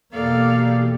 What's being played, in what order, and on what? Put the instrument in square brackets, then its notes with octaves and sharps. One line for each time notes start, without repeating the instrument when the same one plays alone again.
[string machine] E2 B2 G4 [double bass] A#3 [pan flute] A4 [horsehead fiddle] D5 F5